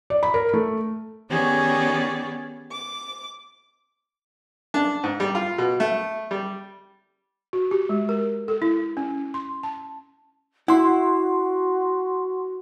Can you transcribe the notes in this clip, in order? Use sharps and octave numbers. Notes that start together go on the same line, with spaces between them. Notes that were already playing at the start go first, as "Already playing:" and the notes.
D5
B5
A#4
A3
D#3 B3 C#4 G4 G#4 D5
D6
D4
G#2
G3
F4
B2
A3
G3
F#4
G4
G#3
A#4
A4
E4
C#4
C6
A5
E4 F#4 F#5 C6